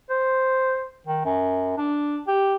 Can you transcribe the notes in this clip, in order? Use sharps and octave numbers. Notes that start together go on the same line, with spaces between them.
C5
D#3
F#2
D4
G4